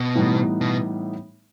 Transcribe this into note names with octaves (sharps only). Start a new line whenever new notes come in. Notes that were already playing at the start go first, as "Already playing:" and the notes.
Already playing: B2
A2 E3 G3 B3 D#4
B2